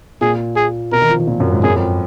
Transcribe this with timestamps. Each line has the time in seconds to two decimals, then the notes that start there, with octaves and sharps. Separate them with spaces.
0.21 A#2 G#4
0.56 G#4
0.92 B2 A#4
1.02 D#3
1.10 F3
1.19 D#3
1.27 A#2
1.40 F#2
1.52 G#2
1.63 F#2 G#4
1.76 F2